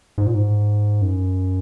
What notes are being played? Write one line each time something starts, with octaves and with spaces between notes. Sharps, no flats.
G#2
A#2
G#2
F#2